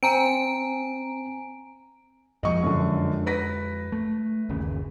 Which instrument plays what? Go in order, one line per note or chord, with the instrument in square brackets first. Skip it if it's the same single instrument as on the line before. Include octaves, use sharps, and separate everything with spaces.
[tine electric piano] C4 [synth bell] G#5 A#5 D7
[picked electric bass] F2 F3 G#3 [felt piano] D#5 C#6
[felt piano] F#2 D3
B4 A#6 B6
[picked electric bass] A3
G1 D#2 C#3